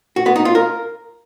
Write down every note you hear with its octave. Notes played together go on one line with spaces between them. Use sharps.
F#4
B3
D#4
F4
A#4